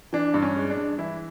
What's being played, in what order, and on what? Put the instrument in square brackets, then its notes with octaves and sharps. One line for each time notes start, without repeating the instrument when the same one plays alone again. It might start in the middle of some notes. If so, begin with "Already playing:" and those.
[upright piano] E3 D4
G2
C#4
G#3
D4
G2
E3 E4